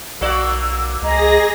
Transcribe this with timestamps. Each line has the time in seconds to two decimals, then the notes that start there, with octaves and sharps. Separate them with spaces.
0.21 B1 A#3 F#4 D5 E6
1.02 C#2 G#4 D#5 A#5 A#6